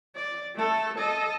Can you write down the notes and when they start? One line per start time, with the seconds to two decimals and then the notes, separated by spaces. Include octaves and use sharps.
0.15 D5
0.55 A3 A4
0.96 A4 D#5